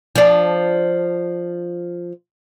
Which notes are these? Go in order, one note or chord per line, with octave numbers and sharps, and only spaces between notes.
F3 D4